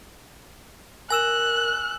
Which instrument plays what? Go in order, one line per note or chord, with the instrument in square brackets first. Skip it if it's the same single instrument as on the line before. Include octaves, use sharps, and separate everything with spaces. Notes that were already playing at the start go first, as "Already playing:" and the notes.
[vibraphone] A#4 [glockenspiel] G#5 E6 E7 [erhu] F#6